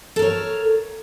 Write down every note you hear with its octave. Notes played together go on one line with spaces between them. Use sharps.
A4 A#4 C#5